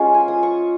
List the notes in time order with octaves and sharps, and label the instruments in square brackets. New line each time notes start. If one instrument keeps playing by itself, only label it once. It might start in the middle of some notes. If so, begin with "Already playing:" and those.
Already playing: [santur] G#3 C#4 F4 C#5
G#5
D#6
C#6